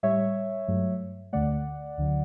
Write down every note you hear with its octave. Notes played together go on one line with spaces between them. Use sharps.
A2 G3 C#5 E5
G2 F#3 A3
D2 D3 A3 D5 F#5
D2 D3 F#3